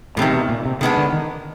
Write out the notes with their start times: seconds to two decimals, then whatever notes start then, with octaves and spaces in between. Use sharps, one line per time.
0.17 E2 A2 C3 D#3
0.33 B2
0.49 A#2
0.66 C3
0.81 C3 D#3 G#3 B3 D4
0.97 D3
1.13 D#3